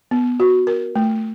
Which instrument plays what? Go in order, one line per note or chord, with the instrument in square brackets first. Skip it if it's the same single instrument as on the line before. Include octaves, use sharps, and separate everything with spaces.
[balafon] B3
F#4
A#4
A3